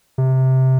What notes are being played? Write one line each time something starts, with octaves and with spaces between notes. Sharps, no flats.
C3